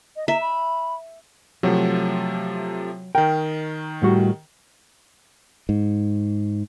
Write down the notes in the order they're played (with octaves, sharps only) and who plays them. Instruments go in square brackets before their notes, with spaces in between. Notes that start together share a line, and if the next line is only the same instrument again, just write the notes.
[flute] D#5
[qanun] E5 [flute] A#5
[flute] B5
[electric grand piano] C3 F3 A3 [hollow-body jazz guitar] F#3
[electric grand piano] D#3 A#4 [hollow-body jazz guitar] G5
[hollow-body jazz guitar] A2 G3 F#4
[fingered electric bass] G#2